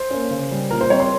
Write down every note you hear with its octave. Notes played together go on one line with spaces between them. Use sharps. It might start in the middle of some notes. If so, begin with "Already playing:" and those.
Already playing: C5
A#3 C#4
C#3
G3 C#4
A#2 A#4
C5
G3 C4 C#5
C6